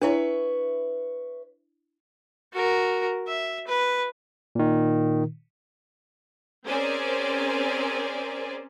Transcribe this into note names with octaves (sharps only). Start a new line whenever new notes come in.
D4 E4 B4 C#5 E5
F#4 A#4
E5
B4
A#2 D#3
C4 C#4 G#4 A#4 C5 D5